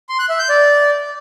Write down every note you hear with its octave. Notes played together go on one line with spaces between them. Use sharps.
C6
F#6
E5
G6
D5